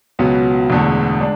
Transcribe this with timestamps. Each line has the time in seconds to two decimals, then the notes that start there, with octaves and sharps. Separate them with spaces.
0.19 C#2 B2 F#3 B3
0.70 E1 E2 D3 A3
1.20 G#3 D4